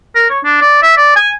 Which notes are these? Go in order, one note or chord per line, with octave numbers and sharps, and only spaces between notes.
A#4
C#5
D4
D5
E5
D5
G#5